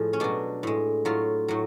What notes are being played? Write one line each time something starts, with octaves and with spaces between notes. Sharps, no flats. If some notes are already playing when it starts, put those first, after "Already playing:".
Already playing: A2 F3 G#3
C#4
B2 F#3 D4
A2 G#3
A2 F#3 F4
A2 F#3